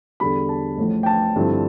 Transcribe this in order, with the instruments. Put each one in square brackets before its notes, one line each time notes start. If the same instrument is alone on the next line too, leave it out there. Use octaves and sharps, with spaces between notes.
[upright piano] E2 D3 G3 B5
A5
A1 A2 F3 A3
G5
A5
G2 D3 F3 C4 E4